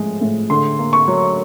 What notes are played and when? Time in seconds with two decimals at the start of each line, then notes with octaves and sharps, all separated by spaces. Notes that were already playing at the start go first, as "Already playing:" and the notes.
Already playing: A2 F3 G#3
0.21 A2
0.50 D3 C6
0.79 A#3
0.93 C#6
1.08 F#3